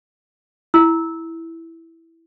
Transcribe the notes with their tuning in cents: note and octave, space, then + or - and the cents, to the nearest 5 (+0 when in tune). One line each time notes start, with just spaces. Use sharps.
E4 +0 E6 -15